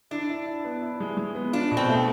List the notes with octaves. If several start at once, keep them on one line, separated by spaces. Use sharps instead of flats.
D4 E4
E4
E4
B3
E4
G#3
G#3
B3
D4 F4
B2
C4
A3